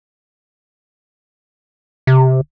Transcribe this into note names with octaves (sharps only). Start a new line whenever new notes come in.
C3